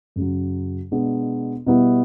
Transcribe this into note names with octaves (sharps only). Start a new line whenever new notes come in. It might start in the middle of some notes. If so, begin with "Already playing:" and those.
F#2 C#3 F#3
B2 G#3 B3 D4
B2 G3 B3 E4